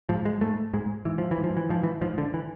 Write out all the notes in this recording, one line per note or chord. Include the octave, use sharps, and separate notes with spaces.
G#2 F3
G#3
G#2 A3
G#2 G#3
G#2 E3
F3
E3
G#2
F3
E3
G#2 F3
E3
G#2 F3
D3
E3